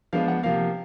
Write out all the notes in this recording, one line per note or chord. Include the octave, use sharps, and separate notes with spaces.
F3 G#3 B3 D4 F5
F#5
C3 F3 A#3 F5